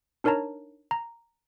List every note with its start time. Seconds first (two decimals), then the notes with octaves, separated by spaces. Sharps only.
0.24 D4 D#4 A#4 C#5 A5 A#5
0.91 A#5